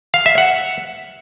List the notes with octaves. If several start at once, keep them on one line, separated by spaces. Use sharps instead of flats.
F5
E5
F#5